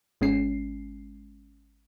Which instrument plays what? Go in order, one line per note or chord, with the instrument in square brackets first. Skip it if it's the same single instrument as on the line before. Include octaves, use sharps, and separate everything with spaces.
[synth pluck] G#1 G#3 C#4 C7